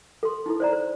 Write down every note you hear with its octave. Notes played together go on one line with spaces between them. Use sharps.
A4 C6
D#4 E4 A4
C5 D5 A#5
C5